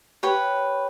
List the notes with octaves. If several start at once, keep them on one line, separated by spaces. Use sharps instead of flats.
G4 B4 C#5